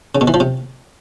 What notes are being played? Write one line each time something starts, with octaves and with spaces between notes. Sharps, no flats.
C#3
B2
E3
F3
C3